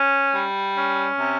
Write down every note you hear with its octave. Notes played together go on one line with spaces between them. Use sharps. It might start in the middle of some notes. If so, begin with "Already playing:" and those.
Already playing: C#4
G3
C#4
C3